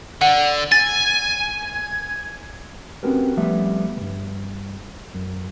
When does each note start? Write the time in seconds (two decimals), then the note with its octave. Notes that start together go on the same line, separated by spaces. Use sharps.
0.21 D3 F#5
0.72 G#5 A6
3.03 C4 C#4 F#4 G4 A#4 B4
3.37 F3 G3 A3 B3 E5
3.97 C#2 G2
5.14 F#2